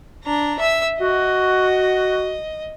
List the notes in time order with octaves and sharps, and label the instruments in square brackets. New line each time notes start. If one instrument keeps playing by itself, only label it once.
[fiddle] D4 A#5
E5 E6
[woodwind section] F#4 [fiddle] D#5